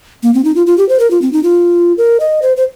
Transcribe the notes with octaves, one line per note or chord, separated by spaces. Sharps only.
A#3
C4
D#4
F4
F4
G4
C5
A#4
F4
C4
D#4
F4
A#4
D#5
C5
C5